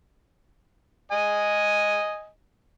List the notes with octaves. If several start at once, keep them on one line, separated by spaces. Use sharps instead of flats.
D#5 G#5